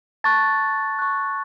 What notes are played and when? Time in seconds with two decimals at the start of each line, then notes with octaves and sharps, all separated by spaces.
0.24 A5 C#6 F#6 A6
0.99 C#6 F#6